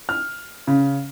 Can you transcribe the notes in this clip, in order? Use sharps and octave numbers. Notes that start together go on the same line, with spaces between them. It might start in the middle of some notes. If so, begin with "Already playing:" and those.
F6
C#3